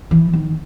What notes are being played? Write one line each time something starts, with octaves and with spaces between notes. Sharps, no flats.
E3
D#3